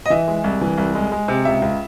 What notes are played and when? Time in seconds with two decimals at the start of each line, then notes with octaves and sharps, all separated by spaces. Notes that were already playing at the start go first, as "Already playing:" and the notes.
0.06 D#5
0.10 E3 E5
0.28 G#3
0.44 C2
0.61 E3
0.77 C2
0.95 G#3
1.12 G#3
1.28 C3
1.45 C#2 E5
1.62 C#2